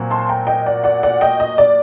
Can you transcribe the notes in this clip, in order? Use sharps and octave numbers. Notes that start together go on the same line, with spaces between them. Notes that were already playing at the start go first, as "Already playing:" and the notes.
Already playing: A#2 F#3 C4 F#4
A5 C6
G5 A#5
D#5 G5
D5 F#5
D5 F#5
D5 F#5
D#5 G5
D#5
D5